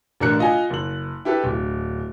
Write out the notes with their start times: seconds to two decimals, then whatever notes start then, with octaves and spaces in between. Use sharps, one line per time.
0.20 A1 D3 A#4 D5 F#6 C#7
0.39 F4 D#5 F5 G#5
0.70 F#1 F#7
1.25 E4 G4 A4 B4
1.44 D1